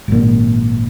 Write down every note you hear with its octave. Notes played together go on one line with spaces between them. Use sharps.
G#1 A#2